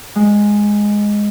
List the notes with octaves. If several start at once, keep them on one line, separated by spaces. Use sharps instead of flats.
G#3